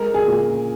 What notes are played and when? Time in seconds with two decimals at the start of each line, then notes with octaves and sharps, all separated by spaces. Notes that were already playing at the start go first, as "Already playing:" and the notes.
Already playing: G#3 A#4
0.14 G#4
0.28 A#2